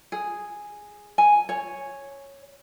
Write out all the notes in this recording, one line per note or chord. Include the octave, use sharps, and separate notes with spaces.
G#4
G#5
C#5